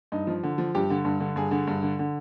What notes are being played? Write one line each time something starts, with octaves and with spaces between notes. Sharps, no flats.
G2 D#4
F3
D3
F3
G2 G4
D3
G2
D3
G2 G#4
D3
G2
D3
D3